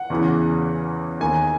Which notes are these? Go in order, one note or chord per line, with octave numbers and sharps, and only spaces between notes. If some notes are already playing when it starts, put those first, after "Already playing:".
Already playing: F#5
E2 C#3 E3
D#2 D#3 G#5